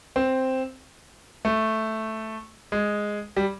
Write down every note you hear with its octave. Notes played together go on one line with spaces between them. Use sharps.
C4
A3
G#3
G3